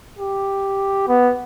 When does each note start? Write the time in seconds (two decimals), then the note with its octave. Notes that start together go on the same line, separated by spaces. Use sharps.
0.19 G4
1.08 B3